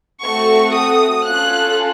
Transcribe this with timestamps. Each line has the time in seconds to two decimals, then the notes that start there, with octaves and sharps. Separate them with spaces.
0.23 A3 C4 F#4 A4 C#6
0.75 D#6
1.25 C#4 F4 A4 F#6